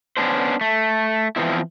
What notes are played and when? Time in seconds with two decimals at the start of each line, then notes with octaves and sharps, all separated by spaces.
0.17 B3 C#4 D4 C5
0.61 A3
1.36 E3 F3 B3 C4 E4